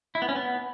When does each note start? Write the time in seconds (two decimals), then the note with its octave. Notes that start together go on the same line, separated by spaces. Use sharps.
0.15 E4
0.22 B3
0.29 C#4
0.36 B3